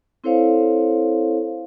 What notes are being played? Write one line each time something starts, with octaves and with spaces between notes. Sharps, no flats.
C4 E4 A4 C5 C#5 F5